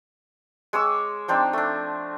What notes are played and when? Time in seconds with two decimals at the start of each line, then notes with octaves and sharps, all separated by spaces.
0.73 G#3 C#5 D6 E6
1.28 F3 C4 D4 D#4
1.53 A3 D4